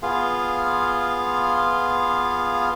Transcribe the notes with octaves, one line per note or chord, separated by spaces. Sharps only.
B3 F4 G#4 F5